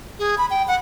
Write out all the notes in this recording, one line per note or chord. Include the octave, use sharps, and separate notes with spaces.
G#4
B5
G5
F#5